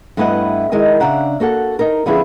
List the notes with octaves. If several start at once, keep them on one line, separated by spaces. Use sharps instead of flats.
G2 A3 B3 E4 D#5 F#5
D#3 G#3 E4 A#4 G#5
C#3 D4 E5 F#5 A#5
A#3 F#4 A4 F#5
D#4 A#4
D3 F3 B3 C#4 E4 G#4